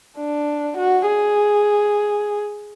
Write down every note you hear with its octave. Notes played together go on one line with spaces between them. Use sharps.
D4
F#4
G#4